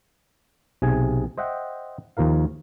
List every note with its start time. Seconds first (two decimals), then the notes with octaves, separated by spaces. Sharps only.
0.82 B1 C3 G#4 G#5
1.38 C5 D#5 E5 F#5 G5
2.17 D#2 F3 A#4 F5